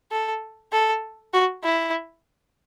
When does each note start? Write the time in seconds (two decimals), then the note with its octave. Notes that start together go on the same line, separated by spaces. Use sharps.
0.12 A4
0.72 A4
1.33 F#4
1.64 E4